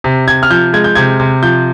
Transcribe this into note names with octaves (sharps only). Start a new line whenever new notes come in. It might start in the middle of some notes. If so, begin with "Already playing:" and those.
C3
C3 G#6
F6
F3 G6
G#3 G#6
G6
C3 G#6
C3
F3 G6